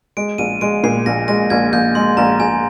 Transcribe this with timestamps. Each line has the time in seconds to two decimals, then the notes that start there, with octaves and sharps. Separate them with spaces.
0.17 G#3 D7
0.38 A#1 D#7
0.61 G#3 D7
0.84 A#2 C7
1.06 A#1 A#6
1.28 G#3 A#6
1.50 A#1 G#6
1.73 A#1 G6
1.95 G#3 C6
2.17 A#1 A#5
2.40 A#1 G#5